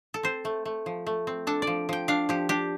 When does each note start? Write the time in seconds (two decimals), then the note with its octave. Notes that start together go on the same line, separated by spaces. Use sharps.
0.14 A4
0.23 C4 C5
0.45 A3
0.65 A3
0.86 F3
1.07 A3
1.27 C4
1.47 D4 A4
1.62 D5
1.67 F3
1.89 F3 G5
2.08 D4 F5
2.29 F3 G4
2.49 D4 G4